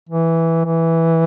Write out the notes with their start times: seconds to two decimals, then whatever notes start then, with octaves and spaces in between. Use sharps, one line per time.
0.09 E3
0.65 E3